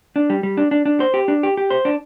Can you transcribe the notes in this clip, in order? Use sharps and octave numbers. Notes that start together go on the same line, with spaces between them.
D4
G3
G3
D4
D4
D4
C5
G4
D4
G4
G4
C5
D4